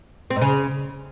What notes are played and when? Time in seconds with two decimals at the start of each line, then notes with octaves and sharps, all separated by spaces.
0.30 C4
0.36 G#2
0.41 C#3